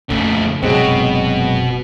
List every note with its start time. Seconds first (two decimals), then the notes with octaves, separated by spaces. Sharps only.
0.10 F2 A#2 C#3 A3
0.63 F1 F#2 B2 F#3 G#3 C4